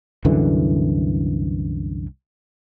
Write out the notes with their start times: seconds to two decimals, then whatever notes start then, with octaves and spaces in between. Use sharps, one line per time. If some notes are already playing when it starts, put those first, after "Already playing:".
0.25 C2 F#2 D3 E3